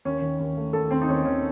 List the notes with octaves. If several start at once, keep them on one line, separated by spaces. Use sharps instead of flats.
D#2 C#4
D#3
D#2
A3
D#2 A4
D#2 C4
D#4
D#2 C#4
D#2 C#4